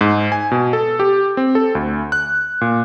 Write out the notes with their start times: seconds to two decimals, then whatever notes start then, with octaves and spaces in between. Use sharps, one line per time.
0.01 G#2
0.32 G#5
0.51 B2
0.73 A4
1.00 G4
1.37 C4
1.55 A4
1.75 D2
2.12 F#6
2.61 A#2